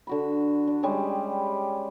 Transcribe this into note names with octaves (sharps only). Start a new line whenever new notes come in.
D3 F#4 B5
D4
G3 G#3 C#4 G4